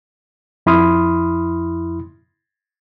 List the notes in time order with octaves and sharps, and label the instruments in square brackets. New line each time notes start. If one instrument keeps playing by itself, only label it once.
[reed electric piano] F2 E4 B5 C6 D#6 F6